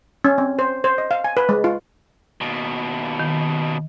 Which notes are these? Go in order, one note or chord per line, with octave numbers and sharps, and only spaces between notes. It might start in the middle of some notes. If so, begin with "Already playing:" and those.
C#4
C4
C5
C5
D#5
F5
G#5
B4
G#3
F4
D#2 B2
D#3